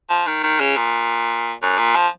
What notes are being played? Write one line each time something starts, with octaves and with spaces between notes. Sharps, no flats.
F3
D#3
D#3
C#3
A#2
F#2
A#2
F3